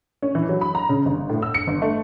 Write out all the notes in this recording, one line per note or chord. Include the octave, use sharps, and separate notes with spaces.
C#4
E3
F#3
B5
A#5
C#3
G1
A2
E6
C#7
G1
A3